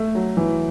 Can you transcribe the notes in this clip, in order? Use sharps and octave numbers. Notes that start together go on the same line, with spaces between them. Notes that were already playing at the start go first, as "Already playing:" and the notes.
Already playing: A3
F#3
E3